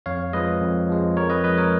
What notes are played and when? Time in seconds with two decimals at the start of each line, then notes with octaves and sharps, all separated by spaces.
0.06 F2 C#5 F5
0.33 F3 G#3 B4 D#5
0.61 F2
0.89 F3 G#3
1.17 F2 A#4 C#5
1.30 B4 D#5
1.44 F3 G#3 B4 D#5
1.58 A#4 C#5